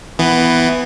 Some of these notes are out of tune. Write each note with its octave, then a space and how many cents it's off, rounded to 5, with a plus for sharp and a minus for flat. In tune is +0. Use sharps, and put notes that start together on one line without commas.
E3 +0 B3 +10